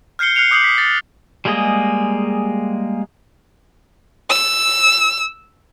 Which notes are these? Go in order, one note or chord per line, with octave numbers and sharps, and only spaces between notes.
F6 G6 C7 C#7 G7
F6 F#6 C7 C#7 F7
D6 D#6 G6 C7 F#7
D#6 B6
A6
G3 G#3 A#3 G#4 D#5
E6